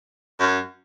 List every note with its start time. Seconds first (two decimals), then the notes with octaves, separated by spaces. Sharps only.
0.40 F#2